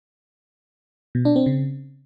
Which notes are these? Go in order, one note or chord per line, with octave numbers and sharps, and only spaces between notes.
B2
D4
C4
C#3